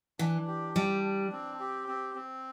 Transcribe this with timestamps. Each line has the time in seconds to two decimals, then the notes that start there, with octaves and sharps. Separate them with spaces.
0.19 E3 D4
0.48 G4
0.76 G3 D4
1.04 D4
1.32 C4
1.60 G4
1.88 C4
2.16 C4